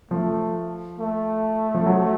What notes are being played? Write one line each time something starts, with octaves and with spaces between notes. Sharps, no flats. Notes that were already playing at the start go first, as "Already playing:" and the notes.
F3 A3
A3
F3
F#3